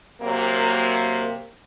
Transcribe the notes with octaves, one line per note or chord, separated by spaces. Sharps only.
C3 F#3 A#3